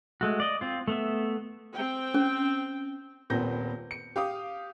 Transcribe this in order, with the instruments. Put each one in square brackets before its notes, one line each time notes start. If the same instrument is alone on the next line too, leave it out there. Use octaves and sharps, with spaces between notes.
[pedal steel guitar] G#3 A3 F#4
D5 D#5
C4 F4
A3 B3 E5
[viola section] C4 G5
[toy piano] C#4
[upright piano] D#1 A#2 B3 C4 G6 A#6
C#7
G4 F5 D6 D#6